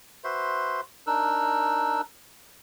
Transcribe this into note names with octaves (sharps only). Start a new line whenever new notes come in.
F#4 B4 C5 E5 C6
D4 D#4 A#4 E6 F#6